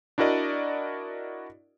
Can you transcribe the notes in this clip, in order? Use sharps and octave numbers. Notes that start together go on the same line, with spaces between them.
D4 E4 F#4 A#4 D5 D#5